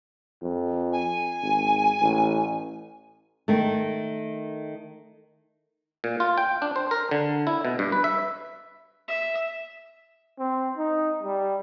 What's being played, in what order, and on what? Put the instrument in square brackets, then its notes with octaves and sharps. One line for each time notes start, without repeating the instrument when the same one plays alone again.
[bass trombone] F2
[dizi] G#5
[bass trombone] G#1
A1
[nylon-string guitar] D#3 A3
[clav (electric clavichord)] A#2
F4
G5
D4
C5
A#4
D3
E4
B2
G2
B4
E5
[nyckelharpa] E5
[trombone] C4
D#4
G3